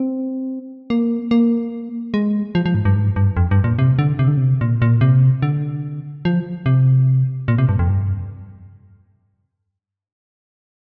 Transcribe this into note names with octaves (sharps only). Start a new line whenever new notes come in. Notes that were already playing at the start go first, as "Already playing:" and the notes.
Already playing: C4
A#3
A#3
G#3
F3
F3
G#2
G2
G#2
G2
F2
G2
A#2
C3
D3
C3
D3
C3
A#2
A#2
C3
D3
F3
C3
A#2
C3
G2
F2
G2